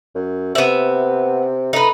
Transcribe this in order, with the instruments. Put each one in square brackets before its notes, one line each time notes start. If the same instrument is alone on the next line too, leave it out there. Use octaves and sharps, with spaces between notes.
[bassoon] F#2
[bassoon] C3 [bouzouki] B3 E5
[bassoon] A3 [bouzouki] D#4 B4